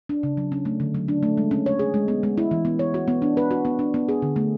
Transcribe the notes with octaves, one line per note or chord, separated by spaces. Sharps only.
D4
C#3
F#3
C#4
A3
D3
F#3
D4
A3
G#3
C#4
C#5
G#4
G#3
B3
G#3
E4
E3
B3
C#5
F#4
B3
D4
B4
F#4
B3
D4
B3
G#4
D3
A3